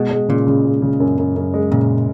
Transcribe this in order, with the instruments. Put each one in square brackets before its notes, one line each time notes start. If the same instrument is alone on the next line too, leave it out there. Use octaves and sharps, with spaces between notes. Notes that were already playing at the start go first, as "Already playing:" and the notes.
Already playing: [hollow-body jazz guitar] B2 [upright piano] G#3
[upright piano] G#3
[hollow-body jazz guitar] A#2 [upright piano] C#3
[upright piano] C#3
G#3
C#3
F#2
F#2
F#2
G#3
[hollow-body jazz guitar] A#2 [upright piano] C#3